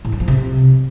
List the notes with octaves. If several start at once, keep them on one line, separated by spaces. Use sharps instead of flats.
A2
G3
F3
C3